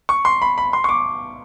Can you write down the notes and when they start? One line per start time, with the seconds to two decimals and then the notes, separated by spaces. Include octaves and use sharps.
0.09 C#6
0.25 C6
0.42 B5
0.58 B5
0.73 C6
0.84 C#6
0.89 D6